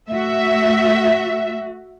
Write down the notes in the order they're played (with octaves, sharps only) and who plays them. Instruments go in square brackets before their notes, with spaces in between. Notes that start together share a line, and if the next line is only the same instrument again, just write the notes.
[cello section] A3 F#4 [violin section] E5